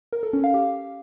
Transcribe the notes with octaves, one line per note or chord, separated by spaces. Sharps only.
A#4
A4
C#4
F5
G4